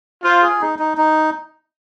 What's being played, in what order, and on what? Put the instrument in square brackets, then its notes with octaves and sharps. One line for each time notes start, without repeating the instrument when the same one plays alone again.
[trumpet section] F4 [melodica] C5
[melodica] G#4
D#4
D#4
D#4